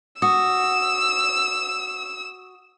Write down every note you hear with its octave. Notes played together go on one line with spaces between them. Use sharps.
F#4 D#6 E6